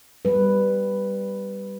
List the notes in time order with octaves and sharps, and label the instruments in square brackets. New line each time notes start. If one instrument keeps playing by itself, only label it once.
[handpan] G3 B4